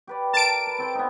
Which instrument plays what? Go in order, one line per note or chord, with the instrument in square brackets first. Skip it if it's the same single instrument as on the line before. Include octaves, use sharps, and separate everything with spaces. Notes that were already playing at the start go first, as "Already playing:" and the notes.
[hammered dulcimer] G4 B4 D5
[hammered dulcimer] A#4 [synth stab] A5 D7
[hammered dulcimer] B4
C4 A4 C5
B3 D#4